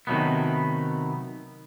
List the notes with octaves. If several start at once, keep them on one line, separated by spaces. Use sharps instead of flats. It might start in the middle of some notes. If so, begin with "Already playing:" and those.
C3 D#3 F3 F#3 A3 B3